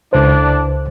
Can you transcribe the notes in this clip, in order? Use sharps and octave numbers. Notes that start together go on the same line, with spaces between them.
C#2 D3 E3 D4 C5